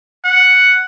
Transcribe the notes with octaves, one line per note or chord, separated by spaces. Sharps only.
F#5